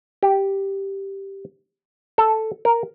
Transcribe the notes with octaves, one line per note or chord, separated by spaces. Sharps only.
G4
A4
A#4